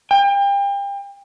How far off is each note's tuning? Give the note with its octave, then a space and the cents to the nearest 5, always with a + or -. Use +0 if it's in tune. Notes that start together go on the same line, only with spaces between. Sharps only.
G5 +35